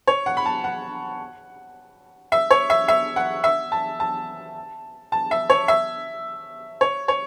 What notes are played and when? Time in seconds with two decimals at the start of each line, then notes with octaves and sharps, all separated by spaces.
0.07 C#5
0.26 F#5
0.37 B5
0.46 A5
0.64 F#5
2.32 E5
2.51 C#5
2.70 E5
2.88 E5
3.16 F#5
3.44 E5
3.72 A5
4.00 A5
5.12 A5
5.31 E5
5.50 C#5
5.68 E5
6.81 C#5
7.08 C#5